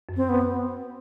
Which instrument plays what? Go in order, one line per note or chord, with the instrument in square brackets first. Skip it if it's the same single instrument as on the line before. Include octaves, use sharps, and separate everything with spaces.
[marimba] F#2
[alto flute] C4
B3